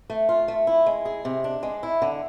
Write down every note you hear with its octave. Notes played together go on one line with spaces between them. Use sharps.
A3
F4
A3
E4
G#3
G#4
C3
D4
G#3
E4
D3